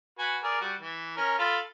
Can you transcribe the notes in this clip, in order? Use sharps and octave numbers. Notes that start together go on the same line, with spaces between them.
F#4 B4 G#5
G#4 A#4 D5
G3 F#4
E3
C#4 A#4
F4 A4 B5